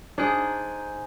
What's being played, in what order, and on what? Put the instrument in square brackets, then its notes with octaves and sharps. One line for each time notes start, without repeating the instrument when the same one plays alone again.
[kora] D4 G#4 [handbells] D#4 C5 G#5